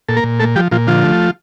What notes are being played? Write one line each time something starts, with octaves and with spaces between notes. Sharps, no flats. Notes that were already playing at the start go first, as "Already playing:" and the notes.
A#2 A4
A#3 A#4
A#2
A3 A4
F3 G3 G4
A#2 F3 F4
D3 F3 F4
A3